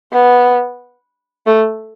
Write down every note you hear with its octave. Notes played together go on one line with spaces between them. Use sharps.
B3
A3